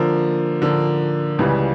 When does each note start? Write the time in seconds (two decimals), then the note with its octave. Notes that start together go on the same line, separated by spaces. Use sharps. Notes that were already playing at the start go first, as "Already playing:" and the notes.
Already playing: D3 F3 A#3
0.62 D3 F3 A#3
1.39 C#2 C#3 E3 G3